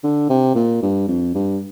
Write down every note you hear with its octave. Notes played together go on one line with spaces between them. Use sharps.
D3
C3
A#2
G2
F2
G2